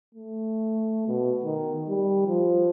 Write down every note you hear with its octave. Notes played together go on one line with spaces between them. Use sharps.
A3
B2
D#3
G3
F3